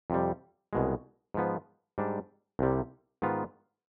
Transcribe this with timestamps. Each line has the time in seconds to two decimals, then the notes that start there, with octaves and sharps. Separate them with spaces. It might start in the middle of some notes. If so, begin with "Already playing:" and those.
0.10 F2 C3 G3
0.73 C2 B2 G#3
1.34 G#2 F3 B3
1.98 G#2 G3 D4
2.59 C2 C3 G3
3.22 G#2 D#3 B3 F4